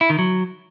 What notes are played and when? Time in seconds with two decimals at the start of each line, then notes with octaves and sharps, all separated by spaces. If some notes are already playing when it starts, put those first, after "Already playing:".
0.01 E4
0.10 D#3
0.19 F#3